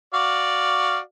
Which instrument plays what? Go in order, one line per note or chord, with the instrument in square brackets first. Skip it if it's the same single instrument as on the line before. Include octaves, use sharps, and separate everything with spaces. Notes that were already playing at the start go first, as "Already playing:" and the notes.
[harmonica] F#4 D5 F5